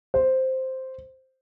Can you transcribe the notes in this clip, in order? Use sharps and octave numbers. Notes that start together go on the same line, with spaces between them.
C5